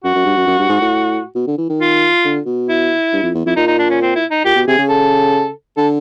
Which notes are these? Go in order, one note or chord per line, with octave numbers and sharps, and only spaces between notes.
F#2 F#4
F#2
G2
F#2
F#2
G2
G#2
A2
B2
D3
E3
D#3
F4
D3
B2
E4
G2
F2
E2
F2 E4
A#2 D#4
D#4
D4
C#4
C4
E4
D#4
A#2 G4
B2
C3 G#4
C#3
A4
D3 A4